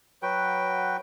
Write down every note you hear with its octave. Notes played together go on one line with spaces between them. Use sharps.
F#3 F#4 B4 G5